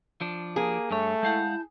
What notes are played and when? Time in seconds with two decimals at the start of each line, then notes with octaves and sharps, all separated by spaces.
0.21 F3 D4
0.56 A#3 G#4
0.91 G2 A3 C#5
1.23 G#3 E4 F5 F#5 A5 G6